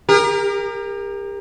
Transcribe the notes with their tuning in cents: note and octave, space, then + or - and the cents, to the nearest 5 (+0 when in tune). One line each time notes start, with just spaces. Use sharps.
G4 +40 A#4 +0